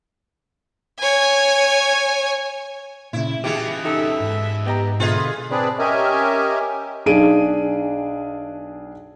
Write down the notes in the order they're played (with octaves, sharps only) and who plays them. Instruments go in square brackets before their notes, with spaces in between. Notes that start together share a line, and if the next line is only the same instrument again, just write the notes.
[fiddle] C#5 G#5
[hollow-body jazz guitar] A#2 C#3 [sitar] E4
[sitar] B2 E3 G#4 [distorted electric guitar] C#4 F4 [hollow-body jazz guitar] G4
[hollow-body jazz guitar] D#4 G4 A4 [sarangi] E5
[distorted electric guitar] G#2
[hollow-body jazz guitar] B3 D#5 A#5 [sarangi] G4
[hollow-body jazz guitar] B2 D3 [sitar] F4 B4 D#5 [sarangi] G#4
[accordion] C4 D4 G#4 B4 D5
C#4 G4 A#4 D#5 E5 G#5
[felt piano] B1 D4 G#4 D7 D#7